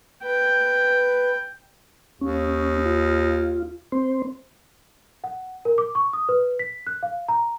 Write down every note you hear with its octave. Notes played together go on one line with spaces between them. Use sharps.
B4 G5
D#2 C#4
F4
C4 C5
F#5
A#4
D6
C#6
D#6
B4
B6
F#6
F5
A#5